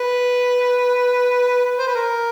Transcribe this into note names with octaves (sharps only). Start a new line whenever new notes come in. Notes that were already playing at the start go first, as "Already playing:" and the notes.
Already playing: B4
C5
B4
A#4